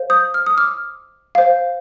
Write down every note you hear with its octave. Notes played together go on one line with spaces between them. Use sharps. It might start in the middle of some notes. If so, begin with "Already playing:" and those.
Already playing: C5 F5
D#6 G6
F6
D#6
D6 F6
C5 F5